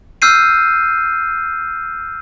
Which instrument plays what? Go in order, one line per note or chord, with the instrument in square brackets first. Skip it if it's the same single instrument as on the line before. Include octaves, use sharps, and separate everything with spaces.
[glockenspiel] E6 F6 G6 C7 D#7